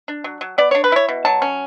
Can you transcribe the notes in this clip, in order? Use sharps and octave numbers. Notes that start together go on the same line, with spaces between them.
D4
F#3
F#3
B3 D5
D4 C#5
B4
E4 C#5
B2
F#3 A5
C#4